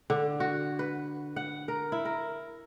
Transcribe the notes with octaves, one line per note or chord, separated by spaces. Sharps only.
D3
F#4
B4
F#5
A#4
E4
A#4